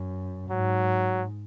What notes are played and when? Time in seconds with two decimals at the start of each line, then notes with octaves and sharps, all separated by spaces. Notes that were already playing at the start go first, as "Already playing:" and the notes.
Already playing: F#2
0.50 G#2 F#3